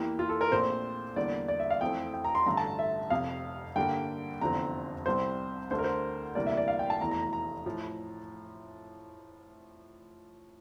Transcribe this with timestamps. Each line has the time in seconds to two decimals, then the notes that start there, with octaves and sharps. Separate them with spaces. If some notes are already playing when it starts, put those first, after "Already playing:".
Already playing: E2 E3 A#3 G4
0.19 F4
0.29 A4
0.41 A#4
0.51 A#1 A#2 A3 C4 C5
1.16 E2 D3 G3 A#3 D5
1.48 D5
1.60 E5
1.70 F5
1.81 F2 E3 A3 C4 G5
2.14 G5
2.25 A#5
2.35 C6
2.46 A1 G2 D3 A3 A#5
2.57 A5
2.79 E5
3.10 F1 F2 C3 F5
3.76 G2 D3 G3 A#3 G5
4.41 F1 E2 D3 F3 C4 A#5
5.06 C2 C3 G3 C4 C5
5.71 D2 D3 A3 C5
5.78 A#4
5.84 C5
6.35 D2 C3 E3 G3 A#3 D5
6.46 E5
6.57 D5
6.68 F5
6.79 G5
6.90 A5
7.00 F1 E2 E3 A3 A#5
7.11 A#5
7.22 A#5
7.33 A#5
7.66 A2 F3